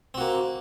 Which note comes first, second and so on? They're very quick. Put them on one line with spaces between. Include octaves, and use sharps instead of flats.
C4 F#4 A#3